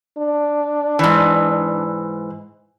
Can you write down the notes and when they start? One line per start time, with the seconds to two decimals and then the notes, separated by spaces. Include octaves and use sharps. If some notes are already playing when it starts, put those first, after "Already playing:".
0.18 D4
0.99 G#2 E3